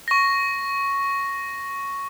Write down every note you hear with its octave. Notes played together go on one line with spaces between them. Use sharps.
C#6 A#6